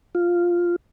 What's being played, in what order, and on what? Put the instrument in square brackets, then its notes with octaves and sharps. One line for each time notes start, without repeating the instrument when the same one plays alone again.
[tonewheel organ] F4